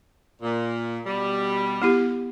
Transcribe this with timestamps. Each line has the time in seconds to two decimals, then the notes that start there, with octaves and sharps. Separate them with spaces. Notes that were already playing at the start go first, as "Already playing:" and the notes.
0.42 A#2
1.07 B2 G3
1.82 B3 E4 G4